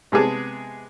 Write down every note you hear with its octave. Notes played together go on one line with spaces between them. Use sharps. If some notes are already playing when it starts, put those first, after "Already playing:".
C3 G#3 B3 G#4 A5